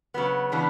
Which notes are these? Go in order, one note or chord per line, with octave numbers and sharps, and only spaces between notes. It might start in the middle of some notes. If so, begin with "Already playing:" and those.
C#3 F#3 B3
C#3 E3 B3 D4